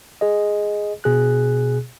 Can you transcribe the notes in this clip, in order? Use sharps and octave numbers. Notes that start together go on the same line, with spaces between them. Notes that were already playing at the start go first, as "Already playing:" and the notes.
G#4 D#5
B2 G#4 F#6